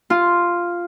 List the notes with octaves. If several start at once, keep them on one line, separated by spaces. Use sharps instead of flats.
F4